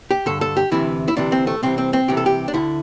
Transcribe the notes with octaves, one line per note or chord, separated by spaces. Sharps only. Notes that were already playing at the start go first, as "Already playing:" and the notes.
G4
G2 D3 A4
A4
G4
D2 C3 E3 E4
E4
D2 C3 E3 D4
C4
A3
C2 C3 E3 C4
C4
C4
C2 C3 E3 G4
A4
G4
D4
D2 D3 E4